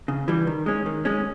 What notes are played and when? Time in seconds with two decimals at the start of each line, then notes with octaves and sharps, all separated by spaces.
0.08 C#3
0.28 E3 G3
0.47 D#3
0.66 G#3 C#4
0.86 D#3
1.05 G#3 C#4